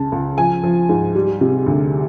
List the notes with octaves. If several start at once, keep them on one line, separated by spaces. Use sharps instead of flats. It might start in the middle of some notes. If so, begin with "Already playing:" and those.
Already playing: C#2 C#3 A5
C#2
F3 G#5
F3
G#2
G3
C3
D2